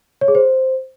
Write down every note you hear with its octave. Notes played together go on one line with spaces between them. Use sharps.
C#5
G#4
C5